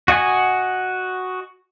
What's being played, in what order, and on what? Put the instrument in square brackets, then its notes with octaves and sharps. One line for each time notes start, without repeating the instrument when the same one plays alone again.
[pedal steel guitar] F#4 D#5 F#5 G#5